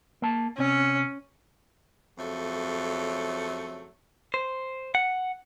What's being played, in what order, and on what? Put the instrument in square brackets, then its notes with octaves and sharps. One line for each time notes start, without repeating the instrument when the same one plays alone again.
[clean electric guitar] A#3 A5
[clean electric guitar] C3 [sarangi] C#4
[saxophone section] F2 C#3 F#3 A3
[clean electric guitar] C5
F#5